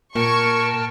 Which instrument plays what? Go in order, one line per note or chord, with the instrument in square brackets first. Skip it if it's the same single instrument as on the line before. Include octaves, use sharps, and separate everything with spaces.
[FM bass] A#2 [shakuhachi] A#4 [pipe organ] G5 A5 F6 [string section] C#6 G#6